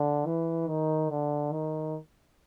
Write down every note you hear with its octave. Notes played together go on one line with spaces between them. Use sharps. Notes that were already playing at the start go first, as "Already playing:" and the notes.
Already playing: D3
E3
D#3
D3
D#3